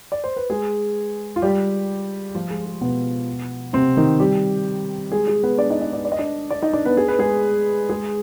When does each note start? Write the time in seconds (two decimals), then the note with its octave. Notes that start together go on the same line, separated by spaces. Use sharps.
0.12 D5
0.24 C5
0.36 B4
0.50 G#3 G#4
1.36 F4
1.42 G3 G4
2.35 F3 F4
2.50 G#3
2.66 G#3
2.81 B2 B3
3.73 C3 C4
3.97 D#3 D#4
4.20 G3 G4
5.12 G#3 G#4
5.27 G#3 G#4
5.43 B3 B4
5.58 D4 D5
5.70 D#4 D#5
5.81 D#4 D#5
5.93 D4 D5
6.05 D5
6.12 D#5
6.19 D4 D5
6.50 D4 D5
6.62 D#4 D#5
6.73 D4 D5
6.85 B3 B4
6.97 G#4
7.08 B4
7.19 G#3 G#4
7.89 G#3 G#4